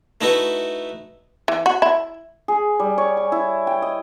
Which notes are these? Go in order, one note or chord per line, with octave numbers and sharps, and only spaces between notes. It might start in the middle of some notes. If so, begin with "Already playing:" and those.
A3 D#4 E4 F#4 B4
E3
F#4
E4
G#4
G3
C#5
G#5
E4
G5
D#5